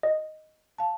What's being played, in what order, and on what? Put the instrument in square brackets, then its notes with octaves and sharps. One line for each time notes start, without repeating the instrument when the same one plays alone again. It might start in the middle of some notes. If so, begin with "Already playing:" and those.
[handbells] D#5
[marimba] F5 A5